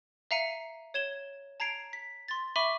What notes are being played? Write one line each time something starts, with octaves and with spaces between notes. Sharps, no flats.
E5 F5 A#5 C7 C#7 D#7
C#5 G#6 E7 G7
A5 A#5 G#6 C7 D7 F7
B6
C6 A6
E5 B5 C#6 D6 D#7 G7